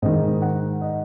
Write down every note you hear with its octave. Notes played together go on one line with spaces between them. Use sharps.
G#2 D#3 D#5
F#5
D#5